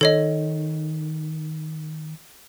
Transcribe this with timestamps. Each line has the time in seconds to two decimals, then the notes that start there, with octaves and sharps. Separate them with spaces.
0.01 D#3 A4 C#5 D#5